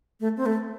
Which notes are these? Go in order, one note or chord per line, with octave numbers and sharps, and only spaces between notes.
A3
C4
A3